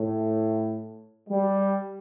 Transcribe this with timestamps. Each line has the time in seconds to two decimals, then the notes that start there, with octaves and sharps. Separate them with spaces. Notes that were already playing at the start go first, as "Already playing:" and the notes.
Already playing: A2
1.28 G3